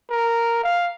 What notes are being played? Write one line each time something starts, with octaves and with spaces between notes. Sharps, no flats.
A#4
F5